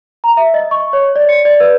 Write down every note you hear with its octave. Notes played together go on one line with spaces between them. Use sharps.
A#5
E5
D#5
C#6
C#5
D5
C#7
D5
B4